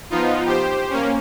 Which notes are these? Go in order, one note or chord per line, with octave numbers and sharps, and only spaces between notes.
F3 B3 D#4 F4
G4 C5
A#3 C#4